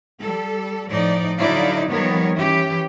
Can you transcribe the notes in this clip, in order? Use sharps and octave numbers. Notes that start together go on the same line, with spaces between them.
G3 A4
A2 F3 D#4 D5
D3 F#3 D#4 E4 D5 F5
D#3 F3 G3 B3 A#4 C#5
E3 C#4 G4